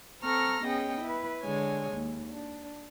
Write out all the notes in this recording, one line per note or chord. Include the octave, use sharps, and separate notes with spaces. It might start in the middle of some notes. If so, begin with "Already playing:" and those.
C4 A4 A#5 C#6 F6 A#6
B3 C#4 G#4 D#5 G5
E4 B4
D3 G#3 C#5 G#5
D#2
D4